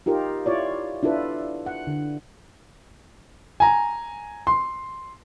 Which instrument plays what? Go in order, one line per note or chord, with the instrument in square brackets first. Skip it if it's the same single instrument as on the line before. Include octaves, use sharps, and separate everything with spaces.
[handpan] D#4 F4 G4 A#4
E4 F4 C#5 D5
D4 E4 F4 A4 B4
F#5
D3
[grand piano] G#5 A#5
C6